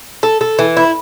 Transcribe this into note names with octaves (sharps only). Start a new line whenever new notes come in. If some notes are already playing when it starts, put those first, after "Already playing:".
A4
A4
E3
E4